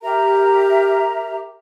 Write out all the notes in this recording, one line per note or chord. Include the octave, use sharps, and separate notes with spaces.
G4 A#4 E5 A#5